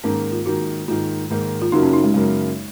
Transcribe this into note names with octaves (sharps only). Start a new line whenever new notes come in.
G#2 D#3 A#3 C#4
F4
G#2 D#3 A#3 F#4
G#2 D#3 A#3 F4
G#2 D#3 A#3
F4
F#2 C#3 F#3 A#3 D#4
C#4
D#4
G#3
F#2 C#3 F#3 G#3 A#3